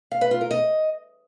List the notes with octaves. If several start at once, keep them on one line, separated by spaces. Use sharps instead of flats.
F5
B4
F4
A#4
D#5